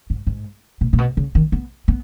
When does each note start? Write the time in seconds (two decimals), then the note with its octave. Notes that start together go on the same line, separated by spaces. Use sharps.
0.10 G#2
0.27 G#2
0.81 A#2
0.93 A#2
0.98 B2
1.17 C#3
1.35 D#3
1.52 B3
1.88 B3